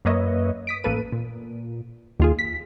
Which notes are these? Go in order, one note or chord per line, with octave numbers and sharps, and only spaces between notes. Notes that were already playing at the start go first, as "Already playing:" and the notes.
F#2 A#3 B4 C#5 D#5 E5
D#6 B6 D7
A1 A#3 A4 B4 D#7
A#2
D#2 F4 G#4
B6